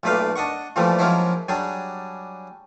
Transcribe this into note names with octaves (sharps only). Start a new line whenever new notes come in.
B1 A#2 A3 B4 F5 D6
D4 D#5 F#5 C#6
A#2 E3 F3 G3 A3
F3 F#3 G#3 A#3 C#4 E4
F#3 G3 D4 G#4